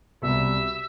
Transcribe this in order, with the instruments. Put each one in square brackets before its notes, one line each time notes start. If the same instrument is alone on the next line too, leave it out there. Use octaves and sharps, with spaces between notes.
[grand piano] C2 B2 G3 B3 [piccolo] E5